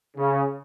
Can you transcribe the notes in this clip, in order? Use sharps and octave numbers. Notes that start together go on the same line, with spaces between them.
C#3